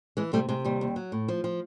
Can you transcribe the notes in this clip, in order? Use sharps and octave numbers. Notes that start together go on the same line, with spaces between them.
E3 G#3
C3 G3 A3
C3 G#3
D#2 G3
D#2
F#3
A2
F3
F3